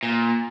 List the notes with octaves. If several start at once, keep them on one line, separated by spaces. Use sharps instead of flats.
A#2